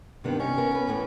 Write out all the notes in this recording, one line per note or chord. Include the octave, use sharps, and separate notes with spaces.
G2 C3 D#3 B3
C#4 D#4
B3 A#4
A#4 B4
A2 E3 A3